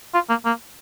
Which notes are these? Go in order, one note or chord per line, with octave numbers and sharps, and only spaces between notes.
F4
A#3
A#3